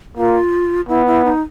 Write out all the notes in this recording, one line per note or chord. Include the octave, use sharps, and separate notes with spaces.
A#3 F4
B3 E4
E4
D#4